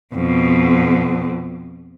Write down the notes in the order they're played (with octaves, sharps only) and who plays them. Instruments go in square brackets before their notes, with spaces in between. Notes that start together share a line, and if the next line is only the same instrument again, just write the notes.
[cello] F2 B2